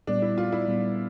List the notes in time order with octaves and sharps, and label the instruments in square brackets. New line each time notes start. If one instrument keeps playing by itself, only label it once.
[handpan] A#2 G3 B3 [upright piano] D4
[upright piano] E4
F4
E4
[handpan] A#2 G3 B3